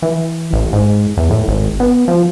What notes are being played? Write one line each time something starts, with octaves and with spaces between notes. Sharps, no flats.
E3
A1
G#2
E2
A2
G#1
B3
F3